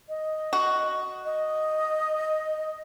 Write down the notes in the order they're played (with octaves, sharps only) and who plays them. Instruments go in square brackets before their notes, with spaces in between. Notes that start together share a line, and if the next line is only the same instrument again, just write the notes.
[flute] D#5
[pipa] F#4
[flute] D#5